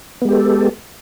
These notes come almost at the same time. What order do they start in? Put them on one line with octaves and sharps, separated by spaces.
B3 G#3 G4 A4